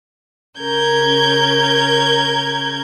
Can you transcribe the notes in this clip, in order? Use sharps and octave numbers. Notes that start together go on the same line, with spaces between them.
C#3 C#4 A#4 G6 G#6